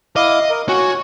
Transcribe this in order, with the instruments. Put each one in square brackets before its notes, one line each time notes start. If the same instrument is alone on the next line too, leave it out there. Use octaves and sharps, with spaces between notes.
[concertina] E4 F5 D6 [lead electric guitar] D#5
[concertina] A#4
[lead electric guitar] F#4 [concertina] C#5 G#5